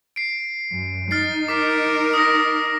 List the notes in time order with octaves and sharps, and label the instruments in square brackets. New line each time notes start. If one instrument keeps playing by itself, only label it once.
[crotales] C7 D7
[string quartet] F#2
[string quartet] D#4 [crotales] F6 A6 C7
[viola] A#4 [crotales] D6 B6 C7
[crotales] D#6 A#6